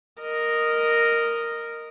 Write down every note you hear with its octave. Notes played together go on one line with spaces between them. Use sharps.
A#4 D#5